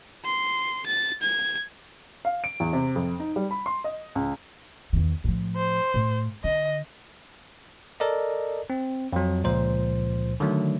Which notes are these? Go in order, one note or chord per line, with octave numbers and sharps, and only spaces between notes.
C6
A6
G#6
F5
D7
E2
C3
F2
D#4
G3
B5
C6
D#5
C#2
E2 D#3
A2 F3
C5
A2
D3 D#5
A4 A#4 D5 D#5
C4
F2 F#3
C#2 A#2 F3 C5
D3 D#3 F#3 A3